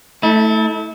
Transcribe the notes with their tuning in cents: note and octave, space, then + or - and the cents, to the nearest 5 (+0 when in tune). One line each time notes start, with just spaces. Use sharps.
A3 +0 E4 -35